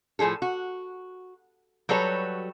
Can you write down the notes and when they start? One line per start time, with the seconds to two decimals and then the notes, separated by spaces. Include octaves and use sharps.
0.19 A2 C#3 F3 G#4 A4
0.42 F#4
1.89 F#3 G3 F#4 A4 B4 C#5